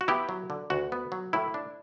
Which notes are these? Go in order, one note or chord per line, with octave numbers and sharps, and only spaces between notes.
F#4
B3 E4 G4
F#3
D3
D2 F#4
B3
F#3
A2 E4
D4